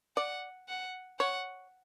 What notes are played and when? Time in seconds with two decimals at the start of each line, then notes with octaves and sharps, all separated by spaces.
0.16 D5 F#5
0.69 F#5
1.19 C#5 F#5